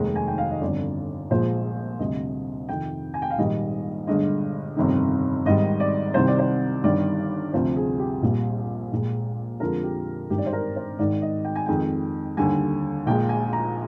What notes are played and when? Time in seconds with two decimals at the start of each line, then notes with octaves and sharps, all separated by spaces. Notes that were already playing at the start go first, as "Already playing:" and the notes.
Already playing: F1 D#2 D#3 G#3
0.16 G#5
0.28 G5
0.38 F5
0.50 D#5
0.61 G1 F2 D3 D5
1.30 A#1 A#2 F3 G#3 C5
1.99 D2 C3 G3 D#5
2.69 F2 C3 D#3 G5
3.14 G#5
3.22 G5
3.31 F5
3.38 A#1 G#2 D#3 G3 D#5
4.07 G1 G2 D3 G#3 D#5
4.76 G1 F2 C3 D#3
5.45 G#1 G#2 D#3 G3 D#5
5.80 D5
6.14 C2 C3 D#3 G3 C5
6.28 D5
6.39 C5
6.84 G1 G2 D#3 G3 D5
7.53 D2 C3 F3 C5
7.76 G#4
7.99 G4
8.22 A#1 A#2 G3
8.92 A#1 A#2 G#3
9.60 F2 D3 F3 G#3 A#4
9.83 G4
10.30 G#1 G2 D#3 G4
10.38 D5
10.46 C5
10.53 A#4
10.76 C5
10.99 G#1 G#2 D#3 D5
11.22 D#5
11.45 G5
11.56 G#5
11.66 F2 D#3 G#3 G5
12.37 D#2 D3 G3 G#5
13.06 A#1 A#2 G#3 G5
13.29 G#5
13.53 A#5